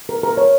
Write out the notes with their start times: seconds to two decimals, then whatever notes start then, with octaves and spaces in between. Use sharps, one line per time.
0.09 A#4
0.23 A#4
0.37 C#5